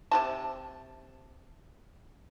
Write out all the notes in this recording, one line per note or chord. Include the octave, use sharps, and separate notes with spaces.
C3 F#4 A5